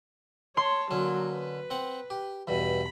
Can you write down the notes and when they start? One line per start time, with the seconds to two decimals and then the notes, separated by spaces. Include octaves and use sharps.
0.57 C#5 A5 C6
0.91 D3 F#3 A#3 C#4
1.29 B4
1.70 C4 F#5
2.10 G4
2.47 E2 G2 B2 B5